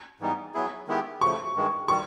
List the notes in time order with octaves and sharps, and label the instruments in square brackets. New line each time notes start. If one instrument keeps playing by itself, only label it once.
[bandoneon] G#2 E3 G3 B3 D#4
F#3 B3 E4 G#4
D#3 G#3 B3 E4 G4
[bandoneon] C#3 F3 A3 [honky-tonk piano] C#6
[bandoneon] G2 D#3 G#3
[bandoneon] D#3 G3 [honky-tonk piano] C#6